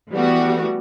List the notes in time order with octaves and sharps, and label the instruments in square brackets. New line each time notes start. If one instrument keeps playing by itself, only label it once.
[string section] E3 G3 A3 B3 F#4